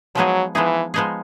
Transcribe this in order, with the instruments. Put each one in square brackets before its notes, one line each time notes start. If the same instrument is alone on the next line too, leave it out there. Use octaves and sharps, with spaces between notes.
[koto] F3 G#3 B3 D#4 G#4 [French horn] F#3
[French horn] E3 [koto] F3 G#3 B3 D#4 G#4
[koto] F3 G#3 B3 D#4 G#4